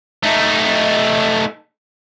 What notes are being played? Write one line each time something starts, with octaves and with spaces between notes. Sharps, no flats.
A3 D#4